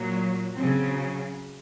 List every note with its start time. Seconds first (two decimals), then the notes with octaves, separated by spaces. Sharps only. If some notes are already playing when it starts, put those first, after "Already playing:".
Already playing: A#2 F#3
0.54 C#3 F#3 C4